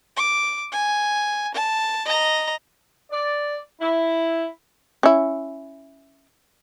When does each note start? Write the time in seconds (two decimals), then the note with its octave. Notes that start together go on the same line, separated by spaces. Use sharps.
0.17 D6
0.72 G#5
1.54 A5
2.06 D#5 A#5
3.11 D5
3.81 E4
5.03 C#4 E4